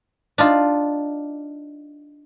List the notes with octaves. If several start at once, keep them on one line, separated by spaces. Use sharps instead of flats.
D4 D#4 F4